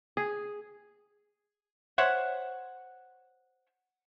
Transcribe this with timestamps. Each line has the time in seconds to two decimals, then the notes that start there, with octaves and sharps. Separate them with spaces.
0.17 G#4
1.98 C5 C#5 E5 F#5